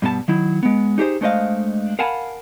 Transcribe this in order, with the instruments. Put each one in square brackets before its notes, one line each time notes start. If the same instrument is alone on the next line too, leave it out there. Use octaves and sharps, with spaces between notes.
[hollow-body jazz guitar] G2 B2 G4 A5
D#3 F#3 E4
G#3 B3
D#4 G4 G#4 C5
G#3 A3 D4 C5 D#5 F5
A#4 F5 F#5 G#5 A5 B5